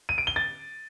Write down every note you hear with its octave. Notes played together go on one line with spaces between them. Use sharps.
D#7
D7
G7
A6